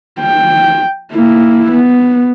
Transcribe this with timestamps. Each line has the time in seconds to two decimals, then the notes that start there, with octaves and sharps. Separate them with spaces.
0.20 G5
1.13 A#3 E4
1.72 B3